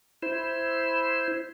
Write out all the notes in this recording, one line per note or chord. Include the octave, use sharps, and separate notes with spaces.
E4 C5